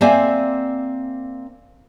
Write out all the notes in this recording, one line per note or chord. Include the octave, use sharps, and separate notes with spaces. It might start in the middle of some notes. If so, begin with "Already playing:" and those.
A#3 C4 C5 D5 E5 G#5